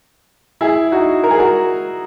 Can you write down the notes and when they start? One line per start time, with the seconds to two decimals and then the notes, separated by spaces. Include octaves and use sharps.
0.61 E4 G#4
0.92 D#4 F#4
1.24 A#4
1.31 G#4
1.39 F#4 A#4